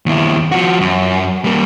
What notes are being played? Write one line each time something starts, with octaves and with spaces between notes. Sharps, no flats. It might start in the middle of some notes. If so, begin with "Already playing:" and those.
D#2 E4
F3 F#4
F#2
G3 A#3